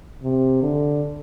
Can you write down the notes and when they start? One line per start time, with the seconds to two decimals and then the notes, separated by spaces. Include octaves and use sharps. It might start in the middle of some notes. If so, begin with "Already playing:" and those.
0.23 C3
0.63 D3